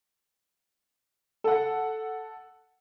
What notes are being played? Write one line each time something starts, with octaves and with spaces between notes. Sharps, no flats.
A4 F#5